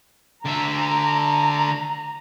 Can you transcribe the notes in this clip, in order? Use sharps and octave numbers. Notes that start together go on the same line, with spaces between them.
D3 E5 A#5